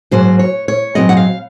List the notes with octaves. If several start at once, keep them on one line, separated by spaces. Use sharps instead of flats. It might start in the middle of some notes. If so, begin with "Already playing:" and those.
G#2 F#3 A#3 C5
C#5
C#5
G#2 F#3 C4 D#5
F#5
F5